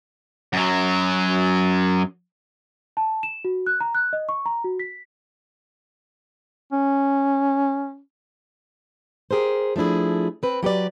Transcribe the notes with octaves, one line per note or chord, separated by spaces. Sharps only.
F#2 F#3
A5
E7
F#4
F#6
A#5
F#6
D#5
C#6
A#5
F#4
B6
C#4
G4 G#4 A#4 C5
F3 A3 D4 E4 G#4
C4 B4
F#3 G4 B4 D5